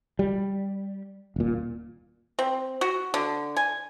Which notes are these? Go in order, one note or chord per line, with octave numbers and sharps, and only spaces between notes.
G3
D#1 A#2
C4
F#4
D3
G#5